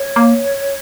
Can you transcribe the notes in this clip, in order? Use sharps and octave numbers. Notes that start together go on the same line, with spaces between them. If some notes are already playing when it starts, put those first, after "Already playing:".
Already playing: C#5
A#3